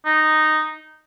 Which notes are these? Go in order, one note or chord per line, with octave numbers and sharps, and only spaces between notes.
D#4